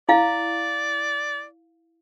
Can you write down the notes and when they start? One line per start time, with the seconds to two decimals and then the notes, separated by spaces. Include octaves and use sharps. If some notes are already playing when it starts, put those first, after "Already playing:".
0.09 E4 D5 F5